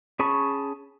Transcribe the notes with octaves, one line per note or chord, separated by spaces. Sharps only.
C#4 G#4 A5 B5 C#6